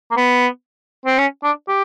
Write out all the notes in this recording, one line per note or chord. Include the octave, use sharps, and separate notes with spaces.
A#3
B3
C4
C#4
D4
G4